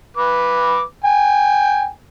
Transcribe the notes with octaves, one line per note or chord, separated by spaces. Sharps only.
B4 D6
G5 G#5